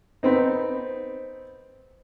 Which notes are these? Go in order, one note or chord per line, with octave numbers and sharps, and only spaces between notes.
B3 C4 D#4